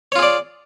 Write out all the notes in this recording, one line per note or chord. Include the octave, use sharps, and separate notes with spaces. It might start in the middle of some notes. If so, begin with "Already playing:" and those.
F4 G#4 C#5 D5